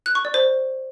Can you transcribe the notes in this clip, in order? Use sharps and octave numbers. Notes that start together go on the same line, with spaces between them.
F#6
C#6
D5
C5